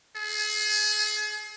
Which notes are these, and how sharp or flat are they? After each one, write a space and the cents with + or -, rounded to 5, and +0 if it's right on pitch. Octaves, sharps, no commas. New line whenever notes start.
G#4 +40